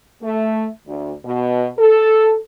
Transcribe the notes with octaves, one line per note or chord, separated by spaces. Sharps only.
A3
D2
B2
A4